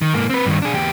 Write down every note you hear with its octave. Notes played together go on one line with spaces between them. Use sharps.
D#3
G#2 A#3
C4 B4
G2 D#3
D4 G#4
E2 G4